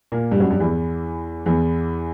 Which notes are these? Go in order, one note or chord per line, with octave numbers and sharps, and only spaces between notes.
A#2 A#3
G2 G3
F#2 F#3
G2 G3
E2 E3
E2 E3